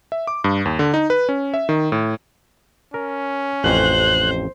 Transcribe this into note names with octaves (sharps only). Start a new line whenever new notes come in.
E5
D6
G2
D#2
D3
D#4
B4
C#4
E5
D#3
A2
C#4 A#4
A1 F2 C5 F#6